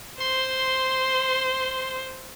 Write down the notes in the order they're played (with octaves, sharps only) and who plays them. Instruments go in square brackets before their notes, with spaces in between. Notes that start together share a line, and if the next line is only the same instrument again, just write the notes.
[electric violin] C5 [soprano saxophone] C6